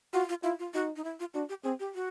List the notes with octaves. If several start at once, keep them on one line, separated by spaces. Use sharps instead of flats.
F4 F#4
F4
E4 F4
F4
D#4 F#4
D#4
E4
F4
D4 F#4
G4
C4 G#4
G4
F#4